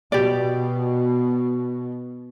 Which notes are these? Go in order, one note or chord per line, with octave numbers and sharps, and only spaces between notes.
B2 G4 D5